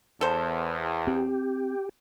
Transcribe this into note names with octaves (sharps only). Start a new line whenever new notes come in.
E2 A4 C5
C4 G4